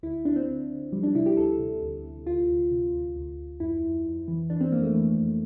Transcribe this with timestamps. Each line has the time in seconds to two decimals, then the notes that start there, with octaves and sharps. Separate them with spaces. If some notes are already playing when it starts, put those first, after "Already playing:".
0.03 D2 E4
0.25 D2 D4
0.36 C4
0.47 D2
0.70 D2
0.92 F3 G3
1.03 D4
1.15 C3 E4
1.26 G4
1.37 D2 A4
1.59 C3
1.82 D2
2.04 C3
2.26 D2 F4
2.49 D2
2.71 C3
2.93 D2
3.16 D2
3.39 D2
3.60 F2 E4
3.83 F2
4.06 F2
4.28 E3
4.50 E3 D4
4.61 C4
4.72 F2 A#3
4.83 A3
4.94 E3
5.16 F2